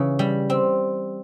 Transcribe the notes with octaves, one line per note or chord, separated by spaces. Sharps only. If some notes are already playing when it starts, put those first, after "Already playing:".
Already playing: C#3 E3
G3
C4